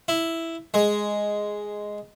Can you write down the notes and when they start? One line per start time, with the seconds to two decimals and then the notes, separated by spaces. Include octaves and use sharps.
0.08 E4
0.74 G#3